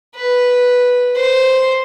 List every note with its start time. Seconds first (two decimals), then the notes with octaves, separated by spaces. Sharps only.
0.15 B4
1.16 C5